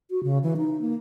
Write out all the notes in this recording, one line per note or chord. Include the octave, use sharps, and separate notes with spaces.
F#4
C#3
E3
D#4
A#3